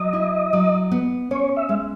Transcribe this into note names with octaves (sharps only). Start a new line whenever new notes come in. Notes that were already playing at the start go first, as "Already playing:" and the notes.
Already playing: F#3 D#5
E4
F#3
B3
C#4 C#5
E5
G#3